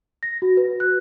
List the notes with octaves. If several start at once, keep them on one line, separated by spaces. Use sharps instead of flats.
A#6
F#4
B4
F#6